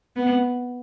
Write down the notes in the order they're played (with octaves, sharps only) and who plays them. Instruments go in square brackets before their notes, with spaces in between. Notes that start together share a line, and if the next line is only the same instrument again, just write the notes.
[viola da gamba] B3